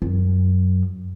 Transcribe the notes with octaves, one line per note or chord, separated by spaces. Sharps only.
F#2